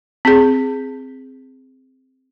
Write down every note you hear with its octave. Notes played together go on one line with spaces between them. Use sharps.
C4 G#4